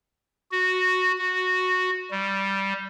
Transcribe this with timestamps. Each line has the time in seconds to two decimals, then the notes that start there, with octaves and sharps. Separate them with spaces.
0.52 F#4
1.18 F#4
2.11 G3